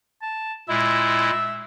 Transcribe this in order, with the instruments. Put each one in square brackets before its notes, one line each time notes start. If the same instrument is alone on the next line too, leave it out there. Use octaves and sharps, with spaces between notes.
[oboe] A5
[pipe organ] A#2 G#3 E4 [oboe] E5